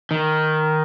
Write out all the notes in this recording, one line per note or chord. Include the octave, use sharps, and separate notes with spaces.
D#3